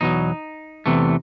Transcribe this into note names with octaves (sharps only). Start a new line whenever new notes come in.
E2 B2 F#3 D#4
E2 C3 E3 A3